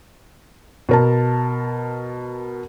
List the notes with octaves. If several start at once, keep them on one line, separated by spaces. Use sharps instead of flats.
B2 A#4 A5